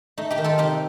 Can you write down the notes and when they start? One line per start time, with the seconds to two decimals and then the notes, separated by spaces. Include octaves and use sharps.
0.18 A3 D#4
0.31 D#4 G4
0.38 D#3
0.44 F4 A4
0.58 C3 D#4 G4